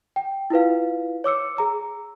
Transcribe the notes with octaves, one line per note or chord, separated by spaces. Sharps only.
G5
E4 F4 B4 F5
C#5 D6 E6 C#7
G#4 A#5 E6